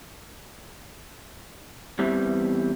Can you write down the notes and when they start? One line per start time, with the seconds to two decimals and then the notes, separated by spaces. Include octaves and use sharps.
1.99 E2 E3 G3 C4